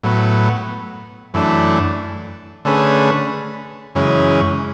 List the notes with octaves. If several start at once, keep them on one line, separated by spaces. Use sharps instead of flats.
A2 F#3 B3
F#2 E3 A3 D4
D3 A3 C#4 G#4 B4
F#2 C#3 E3 G#3 C#4